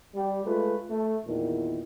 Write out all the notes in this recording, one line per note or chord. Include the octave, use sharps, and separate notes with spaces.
G3 G4
G#3 A3 F4 B4
A3
E2 A#2 D#3 E3